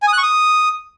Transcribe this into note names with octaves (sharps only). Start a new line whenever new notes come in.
G#5
D#6
F#6
C#6
D#6